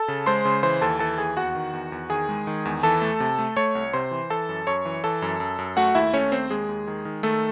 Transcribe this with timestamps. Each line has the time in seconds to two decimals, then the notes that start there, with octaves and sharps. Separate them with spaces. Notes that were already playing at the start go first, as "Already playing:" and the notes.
Already playing: A4 A5
0.08 C#3
0.26 G#3 C5 C6
0.45 C#3
0.63 E3 C5 C6
0.81 D#2 A4 A5
0.99 E3 A4 A5
1.18 D#2 G#4 G#5
1.37 E2 F#4 F#5
1.55 D#3
1.73 E2
1.92 E2
2.10 D#3 G#4 G#5
2.29 G#3
2.47 D#3
2.65 E2
2.83 E3 A4 A5
3.02 A3
3.20 C3
3.39 A3
3.57 A3 C#5 C#6
3.75 C2
3.93 C3 C5 C6
4.11 E3
4.30 E3 A4 A5
4.49 F#2
4.67 F#2 C#5 C#6
4.85 E3
5.04 E3 A4 A5
5.22 F#2
5.40 F#2
5.59 F#2
5.77 A3 F#4 F#5
5.95 D#2 E4 E5
6.13 A3 C#4 C#5
6.32 D#2 C4 C5
6.50 D#2 G#3 G#4
6.69 D#2
6.88 D#3
7.05 D#3
7.23 D#3 A3 A4